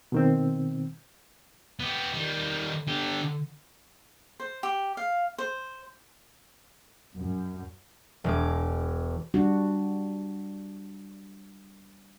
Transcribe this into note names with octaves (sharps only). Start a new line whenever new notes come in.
B2 D#3 C4
B3 G4
D#3 G3
D3 G4
C5
G4
F5
C5
F#2
E1 G#3 D6
G3 D4 F#4